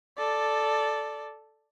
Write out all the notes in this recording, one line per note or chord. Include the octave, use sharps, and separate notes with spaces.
A4 D5